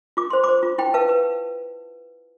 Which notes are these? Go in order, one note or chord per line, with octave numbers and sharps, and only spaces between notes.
F4 D6
C5 C6
C5 B5 D6
F4
E4 G5 B5
B4 F5 A5
B4